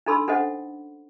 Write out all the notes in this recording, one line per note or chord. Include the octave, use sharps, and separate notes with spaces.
D4 D#4 A4 B5 C6 E6
C#4 D4 A4 C5 D#5 F#5